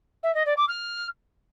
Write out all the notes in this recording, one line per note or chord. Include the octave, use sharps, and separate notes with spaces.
E5
D#5
D5
D6
F6